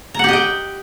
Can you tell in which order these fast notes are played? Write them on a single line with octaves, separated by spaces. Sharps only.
A#5 F#5 G4 D#5 G5